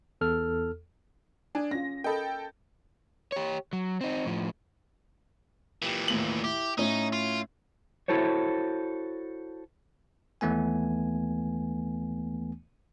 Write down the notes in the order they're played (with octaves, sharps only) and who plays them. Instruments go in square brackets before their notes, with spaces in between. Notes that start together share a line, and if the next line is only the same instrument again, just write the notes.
[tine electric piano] E2 A4 F6
[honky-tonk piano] D4 [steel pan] G#5
[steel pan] C#4 F4 [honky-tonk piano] A#6
[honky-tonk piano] A4 G5 [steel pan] A#4 D#5 B5
[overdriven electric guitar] G4 C#5
F#3
C4 D#4
A2 F3
[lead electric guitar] A#2 E3 [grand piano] G4 E7
[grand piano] D#2 A2 F#7
[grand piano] E4 [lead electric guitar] G4
[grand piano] A2 C#4 E4 [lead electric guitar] D#4
[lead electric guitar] F4
[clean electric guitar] E4 F#4 A4 C5 C#5
[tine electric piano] D#2 E3 A3 B3 G#5